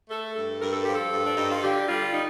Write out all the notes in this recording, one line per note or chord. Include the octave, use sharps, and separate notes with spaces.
A3 A4
G2 A4
G2 A#4
A4
F3 G4
A4
G2
D4
G2 D#4
F4
D3 G4
G3 F4
D#4